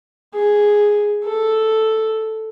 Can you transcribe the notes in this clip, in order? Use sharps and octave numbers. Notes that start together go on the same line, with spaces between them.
G#4
A4